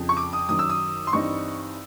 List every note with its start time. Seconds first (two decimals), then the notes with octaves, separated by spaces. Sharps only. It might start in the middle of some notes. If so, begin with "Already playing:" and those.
Already playing: F2 C#3 F3
0.09 C#6
0.17 D6
0.33 D#6
0.49 F#2 D#3 F#3 D#6
0.59 E6
0.70 D#6
1.07 C6
1.12 G2 E3 G3 C4 D#4 C#6